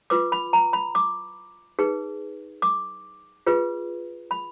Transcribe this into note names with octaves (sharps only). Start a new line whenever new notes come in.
F4 B4 D6
B5
A#5
B5
D6
D#4 G#4 B4
D6
F4 G#4 B4
B5